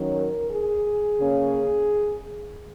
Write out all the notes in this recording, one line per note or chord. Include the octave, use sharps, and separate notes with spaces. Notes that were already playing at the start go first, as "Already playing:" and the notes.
Already playing: D#3 F#3 C#4
A#4
G#4
C#3 A#3 C#4